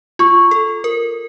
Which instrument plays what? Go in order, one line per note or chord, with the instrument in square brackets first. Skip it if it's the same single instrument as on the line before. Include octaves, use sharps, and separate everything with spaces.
[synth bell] F4 [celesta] C#6
[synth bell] A4
A#4